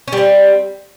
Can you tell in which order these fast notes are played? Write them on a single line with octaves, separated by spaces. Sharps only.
C#4 G3 C4